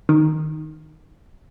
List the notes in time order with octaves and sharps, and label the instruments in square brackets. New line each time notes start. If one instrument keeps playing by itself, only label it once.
[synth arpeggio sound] D#3